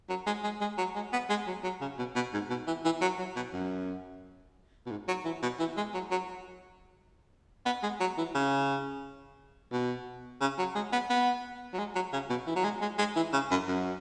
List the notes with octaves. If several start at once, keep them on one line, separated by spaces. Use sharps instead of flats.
F#3
G#3
G#3
G#3
F#3
G#3
B3
G#3
F#3
F#3
C#3
B2
B2
G#2
B2
E3
E3
F#3
F#3
B2
F#2
B2
G#2
F#3
E3
B2
E3
G#3
F#3
F#3
B3
G#3
F#3
E3
C#3
B2
C#3
F#3
G#3
B3
B3
F#3
G#3
F#3
C#3
B2
E3
F#3
G#3
G#3
G#3
E3
C#3
F#2
F#2